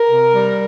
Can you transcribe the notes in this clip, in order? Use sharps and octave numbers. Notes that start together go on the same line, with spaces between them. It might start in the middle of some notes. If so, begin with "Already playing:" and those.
Already playing: A#4
C3
G3